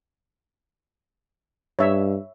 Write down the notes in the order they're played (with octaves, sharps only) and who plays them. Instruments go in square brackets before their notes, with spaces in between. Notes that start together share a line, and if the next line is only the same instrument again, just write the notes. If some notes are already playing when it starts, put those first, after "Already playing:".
[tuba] G2 [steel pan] C#5 E5